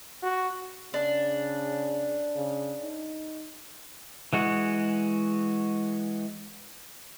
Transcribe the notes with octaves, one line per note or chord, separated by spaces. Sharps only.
F#4
C#3 D4
C#3
D#4
E3 G#3 F#4